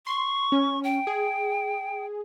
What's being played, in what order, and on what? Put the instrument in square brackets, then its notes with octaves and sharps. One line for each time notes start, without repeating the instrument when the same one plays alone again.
[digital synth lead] C6 [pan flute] C#6
[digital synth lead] C#4
[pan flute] G5
[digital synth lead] G#4